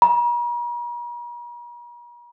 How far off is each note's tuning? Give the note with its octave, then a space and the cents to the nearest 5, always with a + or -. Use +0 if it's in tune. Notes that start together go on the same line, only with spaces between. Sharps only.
A#5 +45